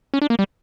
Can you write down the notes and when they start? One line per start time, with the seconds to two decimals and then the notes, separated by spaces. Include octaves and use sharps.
0.14 C#4
0.22 D4
0.30 A#3
0.39 G3